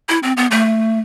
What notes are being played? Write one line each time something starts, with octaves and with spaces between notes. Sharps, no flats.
E4
C4
B3
A3